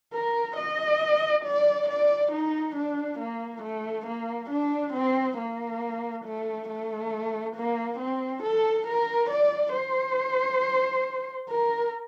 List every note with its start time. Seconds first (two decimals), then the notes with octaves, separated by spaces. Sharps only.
0.14 A#4
0.57 D#5
1.44 D5
1.88 D5
2.32 D#4
2.76 D4
3.19 A#3
3.62 A3
4.06 A#3
4.50 D4
4.93 C4
5.38 A#3
6.25 A3
6.69 A3
7.55 A#3
7.99 C4
8.43 A4
8.87 A#4
9.30 D5
9.74 C5
11.49 A#4